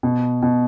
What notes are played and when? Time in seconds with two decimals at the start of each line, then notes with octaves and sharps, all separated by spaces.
0.03 B2
0.43 B2